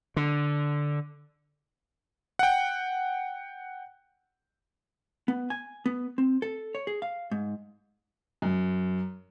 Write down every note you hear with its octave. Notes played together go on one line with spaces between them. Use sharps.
D3
F#5 G5
B3
G#5
B3
C4
A4
C#5
G#4
F5
G#2
F#2